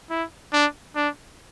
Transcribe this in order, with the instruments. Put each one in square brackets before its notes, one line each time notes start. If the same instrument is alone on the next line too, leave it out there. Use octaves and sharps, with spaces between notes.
[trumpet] E4
D4
D4